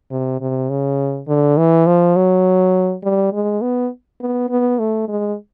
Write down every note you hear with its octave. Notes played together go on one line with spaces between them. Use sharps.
C3
C3
C#3
D3
E3
F3
F#3
G3
G#3
B3
B3
B3
A3
G#3